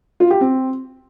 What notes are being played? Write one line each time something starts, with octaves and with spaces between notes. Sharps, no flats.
F4
G4
C4